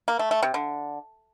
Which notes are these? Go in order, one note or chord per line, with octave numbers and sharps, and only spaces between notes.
A#3
A3
A3
C3
D3